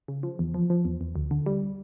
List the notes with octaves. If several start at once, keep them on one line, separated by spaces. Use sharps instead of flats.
C#3
F3
E2
F3
F3
E2
E2
D2
D3
G3